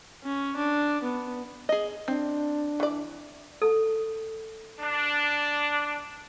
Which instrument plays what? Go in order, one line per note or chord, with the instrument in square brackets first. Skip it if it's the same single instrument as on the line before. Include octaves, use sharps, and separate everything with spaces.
[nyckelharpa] C#4
D4
B3
[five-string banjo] G#4 D#5
[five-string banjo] C4 [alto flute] D4
[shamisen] E3 D5
[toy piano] A4
[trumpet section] D4